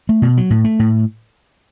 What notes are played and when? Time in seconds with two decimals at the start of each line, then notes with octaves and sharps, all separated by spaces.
0.09 A3
0.22 B2
0.37 F#3
0.50 A2
0.65 A3
0.79 A2